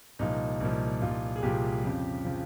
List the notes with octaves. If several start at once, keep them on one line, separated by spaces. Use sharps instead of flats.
C2 A#2 F3 D#4
C2 A#2 F3
C2 A#2 F3 F4
G#4
C2 A#2 F3 G4
F2 C#3 F3
C#3 F3